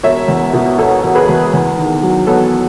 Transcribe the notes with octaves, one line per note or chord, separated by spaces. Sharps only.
E1 C#5 E5
E2
B2
E1 A4 C#5
E1
G#4 B4
E2
E2
D#3
F#3
B3 A4 C#5